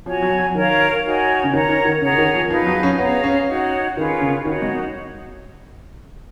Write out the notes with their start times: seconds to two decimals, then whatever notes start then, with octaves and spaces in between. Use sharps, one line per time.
0.06 F3 F#4 C#5 G#5
0.22 F#3
0.39 F#3
0.55 D#3 A#4 C#5 F5
1.04 D#4 F#4 C#5 G#5
1.44 C#3
1.53 D#3 A#4 C#5 F#5 A#5
1.69 D#3
1.85 D#3
2.01 C#3 G#4 C#5 F#5 A#5
2.18 D#3
2.34 F3
2.50 F3 D#4 G#4 B4 F5
2.67 F#3
2.83 C#4
2.98 B3 G#4 C#5 F5 A#5
3.24 C#4
3.48 D#4 F#4 C#5 F#5
3.97 D#3 C#4 F4 G#4 B4
4.21 C#3
4.45 D#3 D#4 F#4 C#5 F#5
4.62 G#3